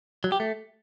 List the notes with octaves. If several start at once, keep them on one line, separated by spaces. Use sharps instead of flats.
F#3
G4
A3